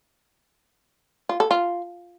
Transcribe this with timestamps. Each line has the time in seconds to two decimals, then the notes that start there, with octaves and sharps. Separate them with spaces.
1.29 F4
1.40 A4
1.51 F4